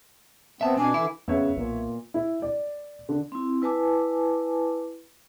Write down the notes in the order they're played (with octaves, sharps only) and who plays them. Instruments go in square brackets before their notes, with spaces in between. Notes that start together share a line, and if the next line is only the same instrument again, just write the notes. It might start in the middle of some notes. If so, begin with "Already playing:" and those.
[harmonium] B3 C4 [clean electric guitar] E5 A5
[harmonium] B2 D4 [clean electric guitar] C4 [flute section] G#5 D6
[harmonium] D3 E3 [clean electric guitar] E4
[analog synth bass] F2 [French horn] C#3 [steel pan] B3 [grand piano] C#5 E5
[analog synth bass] B1 [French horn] A#2
[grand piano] E4
D5
D3
[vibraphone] C4 E4
E4 B4 G#5 A5 D6